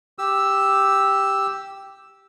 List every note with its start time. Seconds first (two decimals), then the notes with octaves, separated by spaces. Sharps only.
0.19 G4 E6